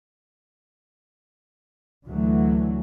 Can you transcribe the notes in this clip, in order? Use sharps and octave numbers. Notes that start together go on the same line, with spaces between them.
D2 D3 E3 F#3 A3